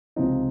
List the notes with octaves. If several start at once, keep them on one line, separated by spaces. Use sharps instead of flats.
C#2 C3 F3 C4 D#4